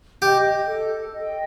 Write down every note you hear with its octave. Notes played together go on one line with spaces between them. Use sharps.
G4 D#5 G5
A4
D#5 G5